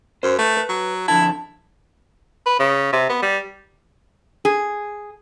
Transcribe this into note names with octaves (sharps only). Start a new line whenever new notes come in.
F#2 C5
A3 B4
B4
F#3
F2 D3 E4 A5
B4
C#3
C3
B3
G3
G#4